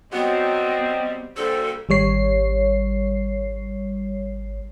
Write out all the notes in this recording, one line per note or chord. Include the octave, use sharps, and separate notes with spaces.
F#3 G3 B3 C4 F#4 D#5
A#2 D3 G3 F#4 A4 C5
G#1 G3 C#5 C7